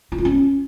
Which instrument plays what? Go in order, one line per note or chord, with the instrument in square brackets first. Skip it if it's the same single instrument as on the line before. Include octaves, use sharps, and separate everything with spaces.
[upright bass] E4
F4
C#4